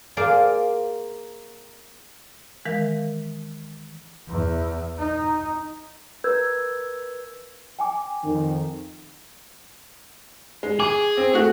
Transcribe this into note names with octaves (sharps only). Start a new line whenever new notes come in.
A#3 G#4 C5 D5 F5
D#3 E3 G#3 A#4 F5
E2
D#4
A#4 B4 E6 G6 G#6
G5 G#5 D6
F2 D#3
G#3
G#4 D6
C4
A3 F#4